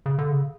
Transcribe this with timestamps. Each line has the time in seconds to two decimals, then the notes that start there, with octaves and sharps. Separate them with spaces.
0.06 C#3
0.19 D3
0.31 C#3